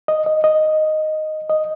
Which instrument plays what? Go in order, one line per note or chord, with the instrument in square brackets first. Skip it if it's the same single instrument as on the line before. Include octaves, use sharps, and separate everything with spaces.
[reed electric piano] D#5
D#5
D#5
D#5